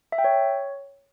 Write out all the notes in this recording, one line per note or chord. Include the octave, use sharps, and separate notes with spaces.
E5
G5
C#5